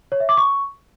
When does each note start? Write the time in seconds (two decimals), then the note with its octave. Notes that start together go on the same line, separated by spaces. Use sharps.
0.12 C#5
0.20 E5
0.29 D6
0.37 C#6